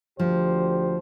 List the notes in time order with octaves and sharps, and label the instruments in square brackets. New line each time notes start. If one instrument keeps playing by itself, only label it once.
[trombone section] D2 G4 C5 [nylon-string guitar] F3